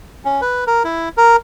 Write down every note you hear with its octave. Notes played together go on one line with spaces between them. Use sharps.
C#4
B4
A#4
E4
A#4